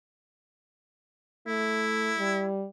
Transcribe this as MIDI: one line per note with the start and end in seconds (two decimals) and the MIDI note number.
1.47 2.13 57
1.47 2.47 64
2.18 2.66 55